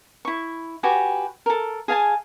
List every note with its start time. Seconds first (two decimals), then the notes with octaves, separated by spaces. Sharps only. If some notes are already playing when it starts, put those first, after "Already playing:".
0.25 E4 C#6
0.83 F#4 G4 B4 G#5
1.46 A4 A#4
1.88 G#4 F5 G#5 A5